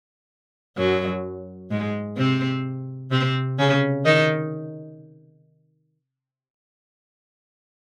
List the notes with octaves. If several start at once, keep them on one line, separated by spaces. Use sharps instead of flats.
F#2 F#3
G#2 G#3
C3 C4
C3 C4
C#3 C#4
D#3 D#4